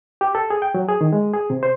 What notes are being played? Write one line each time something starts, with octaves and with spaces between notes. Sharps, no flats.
G4
A4
G#4
G5
F#3
G#4
D#3
G#3
G#4
C3
C5